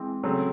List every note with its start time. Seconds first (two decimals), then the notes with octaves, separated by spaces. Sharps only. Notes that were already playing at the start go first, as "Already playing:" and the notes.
Already playing: E3 G#3 C4
0.23 C#3 F#3 A3 C4